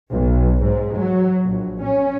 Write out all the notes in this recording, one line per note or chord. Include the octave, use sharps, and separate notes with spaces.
B1
G#2
F#3
A#1
C#4